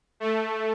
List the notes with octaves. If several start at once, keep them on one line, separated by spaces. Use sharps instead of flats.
A3